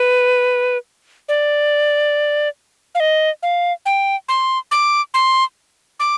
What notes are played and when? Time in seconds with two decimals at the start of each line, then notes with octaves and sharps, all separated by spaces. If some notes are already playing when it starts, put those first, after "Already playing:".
Already playing: B4
1.29 D5
2.95 F5
3.00 D#5
3.43 F5
3.86 G5
4.29 C6
4.71 D6
5.14 C6
6.00 D6